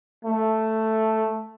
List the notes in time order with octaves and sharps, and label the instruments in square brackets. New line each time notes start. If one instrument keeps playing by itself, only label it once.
[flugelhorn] A3